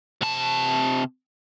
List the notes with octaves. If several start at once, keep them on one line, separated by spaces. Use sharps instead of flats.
C3 A5